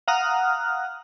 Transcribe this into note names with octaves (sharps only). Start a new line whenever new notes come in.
F5 F#5 A#5 D#6 F6 F#6